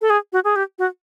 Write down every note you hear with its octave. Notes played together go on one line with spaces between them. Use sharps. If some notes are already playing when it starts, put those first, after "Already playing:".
A4
G#4
F#4
G#4
G4
F#4